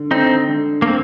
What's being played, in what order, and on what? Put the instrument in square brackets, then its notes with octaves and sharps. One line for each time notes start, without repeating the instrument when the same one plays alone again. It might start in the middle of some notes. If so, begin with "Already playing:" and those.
Already playing: [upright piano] D3
[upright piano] D3 [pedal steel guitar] C4 D#4
[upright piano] D3
[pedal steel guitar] A#3
C4